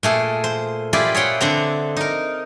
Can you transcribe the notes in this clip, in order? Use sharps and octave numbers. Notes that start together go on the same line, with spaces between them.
A#2 A3 G#4
C5
E4 F4 G4 G#4 D5
G#4 C#5 F#5 G5
D3 C4 A#5
D#4 A#4